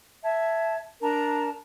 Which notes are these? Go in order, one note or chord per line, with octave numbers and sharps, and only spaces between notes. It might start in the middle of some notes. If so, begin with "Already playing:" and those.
E5 A5 G#6
D4 A#4 A5 A#5